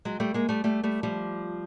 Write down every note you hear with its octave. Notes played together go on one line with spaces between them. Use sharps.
F#3 G#3
G3 A3
G#3 A#3
G3 A3
G3 A3
G3 A3
F3 G3